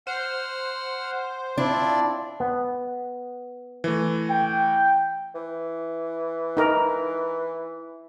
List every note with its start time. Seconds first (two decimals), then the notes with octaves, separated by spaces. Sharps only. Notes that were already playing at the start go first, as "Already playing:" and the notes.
0.07 C5 F#5 F6
1.58 C4 D4 E4 F4 D5
2.40 B3
3.84 E3 A3
4.30 G5
5.35 E3
6.57 D#4 A#4